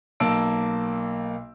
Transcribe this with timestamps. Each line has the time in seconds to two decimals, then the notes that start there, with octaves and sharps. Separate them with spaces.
0.20 B1 A#3 A5 E6 D7